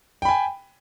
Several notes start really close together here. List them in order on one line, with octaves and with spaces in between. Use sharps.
G5 B5 G#5